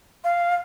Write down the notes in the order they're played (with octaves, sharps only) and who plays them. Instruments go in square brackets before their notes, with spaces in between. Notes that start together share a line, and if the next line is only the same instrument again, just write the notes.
[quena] F5